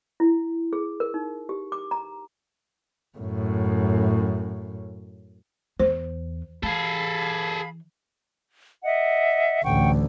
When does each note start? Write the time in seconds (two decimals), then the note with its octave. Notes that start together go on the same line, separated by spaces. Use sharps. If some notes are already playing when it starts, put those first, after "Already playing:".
0.20 E4
0.73 G#4
1.00 A#4
1.14 D#4
1.49 G4
1.72 D6
1.91 A#5
3.18 F#2 A2
5.80 E2 C5
6.63 E3 G#4 A4 F5 B5
8.84 D#5 E5 F#5
9.64 A1 D2 F#5 G5 C#6